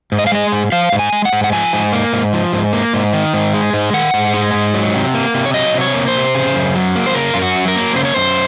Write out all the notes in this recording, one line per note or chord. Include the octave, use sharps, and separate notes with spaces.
G#2
D#5
F5
G#3 D#5
G#2
F3 F5
G#2
G#5
G#3
F#5
G#2
F#5
F3 G#5
G#2
A#3
G#2
F3
G#2
A#3
G#2
D#3
G#2
G#3
G#2
D#3 F#5
G#2
G#3
G#2
F#3
C3
A#3
C3
C#5
F#3 D#5
C3
C#5
A#3
C5
C3
C#3
F#2
F#3
A#3
C5
C#3 A#4
F#2 F4
F#4
F#3
A#4
A#3
C#3 C5
C#5
F#2 C5